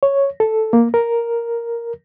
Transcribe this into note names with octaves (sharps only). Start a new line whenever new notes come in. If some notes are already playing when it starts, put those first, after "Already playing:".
C#5
A4
A#3
A#4